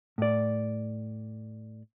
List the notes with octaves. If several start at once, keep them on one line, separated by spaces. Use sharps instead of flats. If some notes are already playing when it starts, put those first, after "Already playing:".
A2 D5